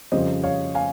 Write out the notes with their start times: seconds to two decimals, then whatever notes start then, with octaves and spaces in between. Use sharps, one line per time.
0.12 F2 C#3 G3 C5 D#5
0.43 C#5 F5
0.75 F5 G#5